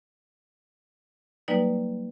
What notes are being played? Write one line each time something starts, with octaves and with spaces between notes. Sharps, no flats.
F#3 G3 A#3 D#4 B4 D5